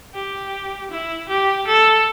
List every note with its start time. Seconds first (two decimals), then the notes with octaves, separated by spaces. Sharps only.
0.14 G4
0.91 E4
1.29 G4
1.67 A4